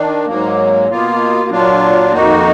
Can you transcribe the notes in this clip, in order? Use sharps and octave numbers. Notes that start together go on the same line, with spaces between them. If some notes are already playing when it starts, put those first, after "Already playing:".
Already playing: D#3 D4
G#2 F#3 A#3
B2 A#3 F4
A#2 F#3 D4 F4
F2 D#3 A#3 D#4 F#4